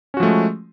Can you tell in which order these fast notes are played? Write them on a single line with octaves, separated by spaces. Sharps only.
C#4 F#4 F3 A3 G#3